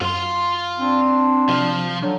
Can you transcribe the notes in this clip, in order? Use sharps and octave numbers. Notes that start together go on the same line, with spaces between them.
F#2 F4 C6
C4 D4
C3 F3 F4
F#3 D4 A4